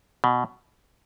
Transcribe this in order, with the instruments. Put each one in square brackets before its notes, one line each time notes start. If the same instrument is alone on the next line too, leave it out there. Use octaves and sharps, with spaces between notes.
[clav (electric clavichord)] B2